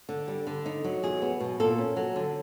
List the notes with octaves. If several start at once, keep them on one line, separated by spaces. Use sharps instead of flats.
D3
G3
D3
D#4
F#3
E2 G#4
B3
B2
A#2 A4
C#4
F#3
D3